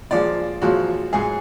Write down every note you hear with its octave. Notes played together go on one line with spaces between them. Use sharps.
A#2 F3 G#3 D5
A#2 F3 G#3 F#4
G#2 F#3 G#4